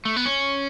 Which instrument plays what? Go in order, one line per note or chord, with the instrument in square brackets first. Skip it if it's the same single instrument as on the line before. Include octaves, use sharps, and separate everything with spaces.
[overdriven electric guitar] A3
B3
C#4